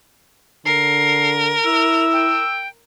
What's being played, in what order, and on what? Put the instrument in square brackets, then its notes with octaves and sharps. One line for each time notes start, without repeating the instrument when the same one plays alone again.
[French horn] D3 [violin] A#4 [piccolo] C7
[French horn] E4 [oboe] E6 [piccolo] F7
[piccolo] G5